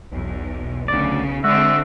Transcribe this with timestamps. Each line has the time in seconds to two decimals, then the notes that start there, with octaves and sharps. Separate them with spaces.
0.11 B1 E2
0.88 D2 C#3 D5
1.44 D3 G#3 C4 F#4 E5